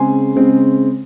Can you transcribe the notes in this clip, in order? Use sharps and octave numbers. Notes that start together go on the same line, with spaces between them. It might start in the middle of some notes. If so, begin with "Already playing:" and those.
Already playing: C#3 G#3 C4 G#5 C6
C#3 G#3 C4